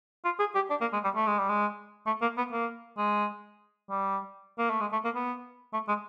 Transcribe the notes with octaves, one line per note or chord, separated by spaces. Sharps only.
F4
G#4
G4
D4
A#3
G#3
G3
A3
G#3
G3
G#3
A3
A#3
B3
A#3
G#3
G3
A#3
A3
G#3
A3
A#3
B3
A3
G#3